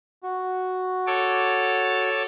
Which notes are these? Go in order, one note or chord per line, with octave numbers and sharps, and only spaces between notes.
F#4
A4 C#5 D6